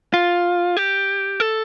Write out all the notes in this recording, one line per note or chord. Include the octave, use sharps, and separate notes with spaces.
F4
G4
A4